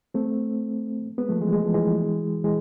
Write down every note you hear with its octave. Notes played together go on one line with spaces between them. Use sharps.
A3 C4
G#3 B3
F3 A3
E3 G#3
G#3
F3
E3 G#3
E3 G#3